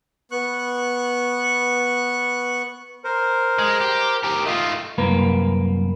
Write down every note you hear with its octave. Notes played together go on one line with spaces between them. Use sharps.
B3 C#6 F#6
A#4 C5
G#3
G4
G4 A#4
A3 F4 D#5
C2 F#2 A#3 A#4 B4